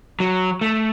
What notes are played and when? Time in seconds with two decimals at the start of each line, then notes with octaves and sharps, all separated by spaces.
0.20 F#3
0.61 A3